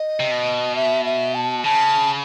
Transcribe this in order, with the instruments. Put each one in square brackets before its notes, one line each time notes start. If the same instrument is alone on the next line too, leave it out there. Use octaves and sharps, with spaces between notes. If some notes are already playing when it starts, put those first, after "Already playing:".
Already playing: [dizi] D#5
[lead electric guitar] C3
B2
[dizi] E5
E5
A5
[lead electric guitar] C#3 [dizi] A5